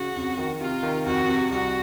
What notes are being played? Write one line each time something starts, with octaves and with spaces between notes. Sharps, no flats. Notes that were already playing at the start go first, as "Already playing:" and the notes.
Already playing: C#3 F#4
F2
D#3
C3 F4
D#3
F2 F#4
C3
C2 F#4